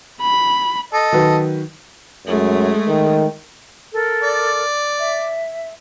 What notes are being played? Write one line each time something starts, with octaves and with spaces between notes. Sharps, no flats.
B5
A4 D#5
D#3 F#3 B4
F#2 G#3 A3
D#3
A4 A#4
D5
E5